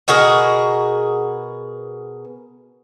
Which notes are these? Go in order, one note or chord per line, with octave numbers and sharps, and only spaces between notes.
B2 F#4 G#4 A#4